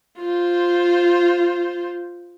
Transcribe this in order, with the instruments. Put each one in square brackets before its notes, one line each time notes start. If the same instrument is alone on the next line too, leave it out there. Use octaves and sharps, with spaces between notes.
[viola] F4 C5